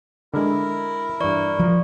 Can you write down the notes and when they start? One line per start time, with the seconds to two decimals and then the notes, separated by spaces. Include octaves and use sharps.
0.34 D3 G#3 E4 A#4
1.20 G2 E3 D5 C#6
1.59 F3